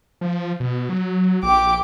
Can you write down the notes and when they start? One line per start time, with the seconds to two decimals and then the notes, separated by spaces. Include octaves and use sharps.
0.21 F3
0.60 B2
0.89 F#3
1.43 A#1 G4 D6